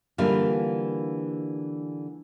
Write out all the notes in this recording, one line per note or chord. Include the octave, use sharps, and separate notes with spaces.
D3 E3 G3 A#3 D4 F4